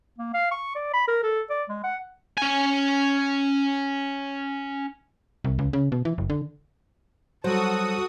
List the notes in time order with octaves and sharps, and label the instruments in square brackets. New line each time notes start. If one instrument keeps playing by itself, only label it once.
[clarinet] A#3
F5
C#6
D5
B5
A#4
A4
D5
G#3
F#5
[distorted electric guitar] C#4 G#5
[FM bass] C2
C#2
C#3
B2
E3
F#1
D3
[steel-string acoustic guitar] F#3 [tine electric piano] G3 C5 [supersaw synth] F#4 D#6 [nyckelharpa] A4